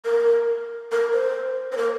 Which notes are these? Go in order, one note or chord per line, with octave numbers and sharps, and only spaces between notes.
A#4
A#4
C5
C5
A#4